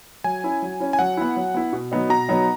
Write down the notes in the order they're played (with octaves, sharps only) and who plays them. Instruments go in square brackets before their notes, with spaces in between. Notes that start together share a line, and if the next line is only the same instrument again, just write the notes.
[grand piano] F#3 [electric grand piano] G#5
[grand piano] C#4 E4
F#3
C#4 E4
[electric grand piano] G#5
[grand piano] F#3 [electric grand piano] F#5
[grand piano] B3 E4
F#3
B3 E4
B2
F#3 B3 D#4
[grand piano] B2 [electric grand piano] A#5
[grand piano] F#3 B3 D#4